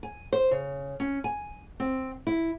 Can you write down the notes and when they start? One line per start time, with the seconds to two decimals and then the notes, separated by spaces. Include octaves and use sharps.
0.03 G#5
0.33 C5
0.51 C#3
1.00 C#4
1.24 G#5
1.80 C4
2.27 E4